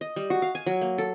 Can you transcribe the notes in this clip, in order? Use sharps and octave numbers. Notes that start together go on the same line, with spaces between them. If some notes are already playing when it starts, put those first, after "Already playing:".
D#5
G3
F#4
F5
G#5
F#3
A#3
A4